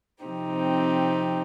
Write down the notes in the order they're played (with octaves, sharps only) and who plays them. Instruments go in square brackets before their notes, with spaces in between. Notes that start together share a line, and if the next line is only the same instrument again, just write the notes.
[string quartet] C3 F3 C4 D#4 G4